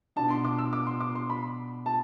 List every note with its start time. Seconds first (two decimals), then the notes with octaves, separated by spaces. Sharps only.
0.16 B2 B3 D4 A5
0.30 C6
0.45 D6
0.58 E6
0.73 D6
0.87 C6
1.01 D6
1.15 C6
1.30 B5
1.86 A5